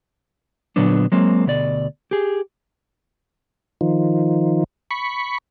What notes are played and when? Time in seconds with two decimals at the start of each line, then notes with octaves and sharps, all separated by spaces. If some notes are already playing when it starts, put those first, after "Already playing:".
0.76 A#2 D3 F#3 B3 D4
1.12 F#3 G#3 A#3 C4
1.46 D2 B2 D5
2.11 G4 G#4
3.81 D#3 F3
4.91 B5 C#6